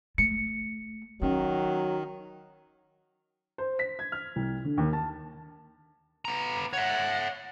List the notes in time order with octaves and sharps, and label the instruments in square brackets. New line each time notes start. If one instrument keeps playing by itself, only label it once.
[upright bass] A3 [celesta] C#7
[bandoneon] D#3 [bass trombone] F#3 [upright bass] C#4
[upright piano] C5
B6
G#6
F6
C2
D3
D#2
A5
[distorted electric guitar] B3 A#5
[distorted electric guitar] C#5 E5 [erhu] F#5